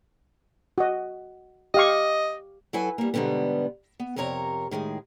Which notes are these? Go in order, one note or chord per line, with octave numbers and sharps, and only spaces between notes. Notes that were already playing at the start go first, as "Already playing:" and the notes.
F#4 D#5
G4 D#5 F5 C#6
F#3 E4 A4 B4 G#5
G3 A#3
G#2 B2 D3 G3 B3
B3
F2 C3 A#4 C#5 A#5
A2 D#3 G#3 G#4